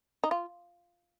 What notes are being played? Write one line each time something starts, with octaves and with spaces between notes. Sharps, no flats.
D#4
F4